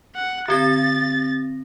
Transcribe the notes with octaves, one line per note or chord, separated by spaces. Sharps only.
F#5
D3 C4 A6 A#6